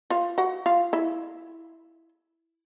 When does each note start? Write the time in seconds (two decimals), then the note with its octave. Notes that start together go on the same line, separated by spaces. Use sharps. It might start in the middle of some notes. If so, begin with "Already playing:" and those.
0.10 F4 F5
0.38 F#4 F#5
0.66 F4 F5
0.93 E4 E5